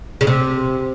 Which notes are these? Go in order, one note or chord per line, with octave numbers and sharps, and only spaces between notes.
C#3
C3